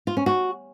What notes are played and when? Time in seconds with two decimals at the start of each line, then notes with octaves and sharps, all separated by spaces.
0.07 F4
0.17 C#4
0.26 F#4